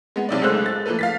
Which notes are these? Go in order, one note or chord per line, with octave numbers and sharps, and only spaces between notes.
G#3 B3
B1 C3 D5
C#2 G#3 A3 C5 E6 F#6
A6
F3 A3 A#3 A4 B4
F5 A6 B6